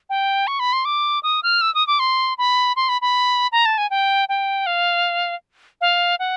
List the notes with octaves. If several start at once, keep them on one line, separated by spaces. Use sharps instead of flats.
G5
C#6
B5
C6
D6
D#6
F6
E6
D#6
D6
C6
B5
C6
B5
B5
A#5
A5
G#5
G5
G5
F5
F5
F#5